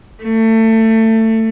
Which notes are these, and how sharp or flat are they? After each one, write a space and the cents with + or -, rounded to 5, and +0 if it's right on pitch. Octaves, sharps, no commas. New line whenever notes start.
A3 +25